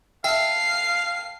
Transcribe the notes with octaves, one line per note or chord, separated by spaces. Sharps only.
E5 F5 G5 A5 C7